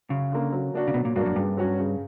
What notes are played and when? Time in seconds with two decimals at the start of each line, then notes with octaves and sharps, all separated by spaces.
0.10 F#2 C#3
0.32 D3 A#3
0.52 F#3
0.74 A#3 D4 F#4
0.87 C#3
0.94 B2 F#3
1.05 A#2
1.16 G2 A#3 D4 F#4
1.26 F#2
1.36 G2 C#3
1.57 F#3 C#4 F#4
1.78 C#3